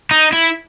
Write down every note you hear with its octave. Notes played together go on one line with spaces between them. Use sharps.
D#4
E4